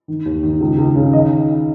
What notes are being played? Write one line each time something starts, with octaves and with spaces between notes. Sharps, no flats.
D#3
D#2
D#3
C#2
C#2
C#3
D#3 D#5